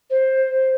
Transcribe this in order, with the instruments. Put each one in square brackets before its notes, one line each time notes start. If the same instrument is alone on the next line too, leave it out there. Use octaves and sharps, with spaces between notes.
[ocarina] C5